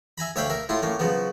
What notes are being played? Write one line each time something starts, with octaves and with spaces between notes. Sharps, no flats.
E5 G#5 A#5 B5
D2 C#5 E5 F5 G5 B5
A#4 E5
A2 E4 F4 C6
A2 A#3 C#4
C#3 F3 F#3 B3